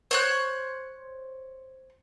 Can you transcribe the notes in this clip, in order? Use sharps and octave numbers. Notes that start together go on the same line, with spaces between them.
C5 C#5 F#6